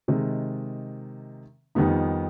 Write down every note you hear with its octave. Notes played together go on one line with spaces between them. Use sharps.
C3 D#3 G#3
F2 D#3 G3 B3 D#4